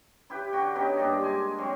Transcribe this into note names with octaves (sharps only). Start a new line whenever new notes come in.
E4 G4 B4 G5
D3 F#4 G5
B3 C#4 D#4 G4
G2 A#3 D4 D#5
G#3 G#5 D6
F#3 C4